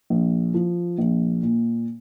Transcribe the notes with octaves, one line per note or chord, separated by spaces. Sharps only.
A#1
F3
A#1
A#2